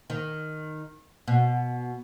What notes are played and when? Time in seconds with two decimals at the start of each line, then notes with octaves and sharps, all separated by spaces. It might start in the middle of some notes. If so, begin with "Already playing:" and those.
0.10 D#3
1.28 B2